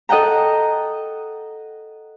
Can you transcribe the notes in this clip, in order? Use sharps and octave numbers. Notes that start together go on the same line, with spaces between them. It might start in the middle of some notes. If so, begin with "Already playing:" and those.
A4 D#5 F#5 G5 A#5